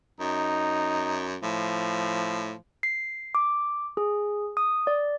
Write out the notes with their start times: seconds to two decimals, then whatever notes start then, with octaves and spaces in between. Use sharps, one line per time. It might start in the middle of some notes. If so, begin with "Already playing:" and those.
0.20 F#2 D#4
1.43 A2 F3
2.83 C7
3.35 D6
3.97 G#4
4.57 D#6
4.87 D5